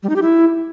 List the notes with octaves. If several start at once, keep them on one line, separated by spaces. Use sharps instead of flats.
G3
D#4
G4
E4